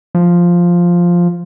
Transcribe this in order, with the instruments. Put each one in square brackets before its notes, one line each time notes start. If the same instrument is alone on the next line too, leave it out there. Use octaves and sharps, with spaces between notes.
[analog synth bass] F3